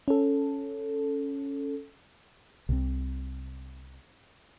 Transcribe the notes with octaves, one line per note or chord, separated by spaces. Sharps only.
C#4 A4
C2 C3